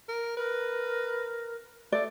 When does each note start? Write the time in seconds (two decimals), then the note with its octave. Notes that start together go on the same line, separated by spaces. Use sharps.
0.08 A#4
0.37 A#4 B4
1.92 A3 D5